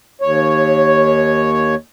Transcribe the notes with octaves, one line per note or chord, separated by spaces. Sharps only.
D#2 C#5